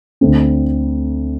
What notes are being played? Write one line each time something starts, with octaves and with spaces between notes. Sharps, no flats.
D2 D3 A3 C4